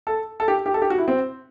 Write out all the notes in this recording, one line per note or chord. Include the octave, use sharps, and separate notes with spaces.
A4
A4
G4
G4
A4
G4
F#4
E4
C4